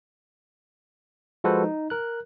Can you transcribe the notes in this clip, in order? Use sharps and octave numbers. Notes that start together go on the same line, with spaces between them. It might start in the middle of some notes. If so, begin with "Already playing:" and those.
F3 G#3 F#4 A4 B4 C5
D#4
A#4 F#6